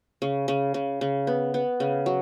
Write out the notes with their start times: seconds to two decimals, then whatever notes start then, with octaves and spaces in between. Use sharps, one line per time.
0.22 C#3
0.48 C#3
0.74 C#3
1.01 C#3
1.27 B3
1.54 B3
1.80 C#3
2.06 F#3